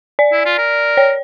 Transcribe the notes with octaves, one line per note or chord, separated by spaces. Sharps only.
D5
E4
F4
A#4
C#5